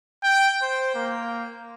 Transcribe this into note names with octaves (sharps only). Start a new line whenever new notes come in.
G5
C5
A#3